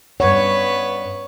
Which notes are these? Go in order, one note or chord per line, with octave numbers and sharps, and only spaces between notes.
G2 B3 B4 C#5 F#5